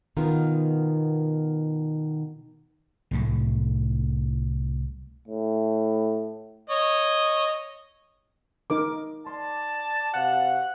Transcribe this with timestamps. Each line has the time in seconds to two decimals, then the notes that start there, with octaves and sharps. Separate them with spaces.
0.17 B2 D#3 B3 F4 A#4
3.11 C2 A2 F#3
5.28 A2
6.70 C#5 D#5
8.70 D#4 A#4 D6
9.27 D5 A5 C6
10.14 C3 F#4 F5 F#5